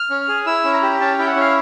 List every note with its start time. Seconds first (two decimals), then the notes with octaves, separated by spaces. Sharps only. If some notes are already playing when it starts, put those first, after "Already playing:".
Already playing: F6
0.10 C#4
0.28 G#4
0.46 E4 E6
0.64 C#4
0.73 A#5
0.82 G4
1.00 C#4 A5
1.19 E4 G5
1.27 F#5
1.36 C#4 F5